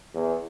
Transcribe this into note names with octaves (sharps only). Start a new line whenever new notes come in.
E2